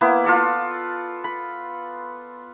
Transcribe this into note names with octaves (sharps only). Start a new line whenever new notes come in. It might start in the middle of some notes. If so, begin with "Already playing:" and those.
A#3 B3 E4
F4 A4 D5
B5